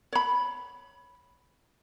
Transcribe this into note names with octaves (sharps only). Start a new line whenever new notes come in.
C#5 B5